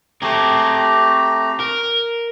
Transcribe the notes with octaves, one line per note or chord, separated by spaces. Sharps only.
A3 C4 G4 G#4 A#5
A#4